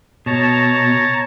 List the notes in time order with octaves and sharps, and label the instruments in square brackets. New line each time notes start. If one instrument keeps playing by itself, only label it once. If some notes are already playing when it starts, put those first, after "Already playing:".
[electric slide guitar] B2 [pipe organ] C#5 A5 A#5